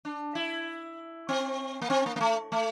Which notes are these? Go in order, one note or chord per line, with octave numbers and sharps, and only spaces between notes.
D4
E4
C4
A#3
C4
A#3
A#3
A3
A3